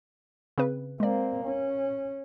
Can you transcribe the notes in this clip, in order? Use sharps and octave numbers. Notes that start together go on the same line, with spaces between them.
C#3 C4 B4
G#3 A#3 C4 D5
C#4